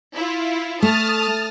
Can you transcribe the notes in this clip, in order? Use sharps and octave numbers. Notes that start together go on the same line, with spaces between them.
E4 F4
A3 A5 D#6 F6